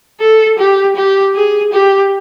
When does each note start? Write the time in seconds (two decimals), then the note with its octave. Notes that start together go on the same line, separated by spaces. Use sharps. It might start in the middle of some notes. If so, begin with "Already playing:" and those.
0.20 A4
0.59 G4
0.96 G4
1.35 G#4
1.73 G4